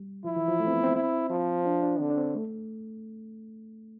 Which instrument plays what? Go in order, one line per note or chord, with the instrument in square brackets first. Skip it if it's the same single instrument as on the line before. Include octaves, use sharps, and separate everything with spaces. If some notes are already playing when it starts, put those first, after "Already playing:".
Already playing: [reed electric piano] G3
[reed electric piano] F3 [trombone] E4
[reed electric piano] E3
F3
A3
C4
B3
C4
[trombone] E4
F3
[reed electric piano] D4
D4
[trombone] D3 [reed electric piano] C4
[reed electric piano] D4
C4
A3